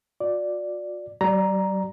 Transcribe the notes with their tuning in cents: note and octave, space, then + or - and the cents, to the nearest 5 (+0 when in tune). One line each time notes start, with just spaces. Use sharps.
F#4 -45 D5 +0
G3 -45 D5 +10 A#5 +5